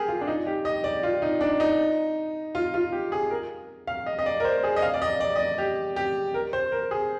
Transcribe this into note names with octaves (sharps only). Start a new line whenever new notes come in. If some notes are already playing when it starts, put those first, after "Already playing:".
Already playing: G4 G#4 A#4
F4
D4
D#4
G4
D#5
D5
F4
D#4
D4
D#4
F4
F4
G4
G#4
A#4
F5
D#5
D#5
D5
A#4
C5
G#4
D#5
F5
D5
D#5
D5
D#5
D5
G4
G4
A#4
C5
A#4
G#4